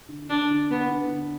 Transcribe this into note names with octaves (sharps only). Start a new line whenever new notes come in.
D3
D3 D4
D3
B3 D4
D3
D3